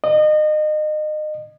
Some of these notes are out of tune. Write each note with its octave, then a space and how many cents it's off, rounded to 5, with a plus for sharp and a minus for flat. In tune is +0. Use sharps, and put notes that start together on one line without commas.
D#5 -30